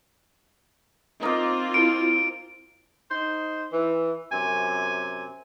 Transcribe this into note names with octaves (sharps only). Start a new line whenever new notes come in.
A#3 C4 D#4 F4
E4 A#4 B5 D7
D#4 C5
E3
F#2 C3 G#5